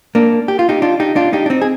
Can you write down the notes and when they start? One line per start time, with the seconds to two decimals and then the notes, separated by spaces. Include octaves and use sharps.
0.15 A#3 D4
0.48 G4
0.59 F4
0.69 D#4 G4
0.82 D4 F4
1.00 D#4 G4
1.16 D4 F4
1.33 D#4 G4
1.46 D4
1.50 C4 D#4
1.61 G#4